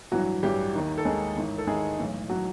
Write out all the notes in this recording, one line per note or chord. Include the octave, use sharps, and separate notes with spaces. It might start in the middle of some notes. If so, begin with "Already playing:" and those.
A1 G2 E3 F#3 F#4
A1 G2 E3 G3 G4
D#2 D#3
A4
D#2 D#3 G#3 G#4
A1 G#2 D#3
A4
A1 G#2 D#3 G#3 G#4
B1 A2 E3
A2 E3 F#3 F#4